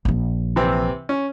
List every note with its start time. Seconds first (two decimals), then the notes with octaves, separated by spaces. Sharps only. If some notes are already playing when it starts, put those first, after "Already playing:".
0.05 A#1 F3
0.56 C3 E3 C4
1.09 C#4